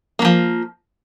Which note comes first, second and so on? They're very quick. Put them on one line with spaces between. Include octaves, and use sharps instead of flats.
A#3 F#3 F3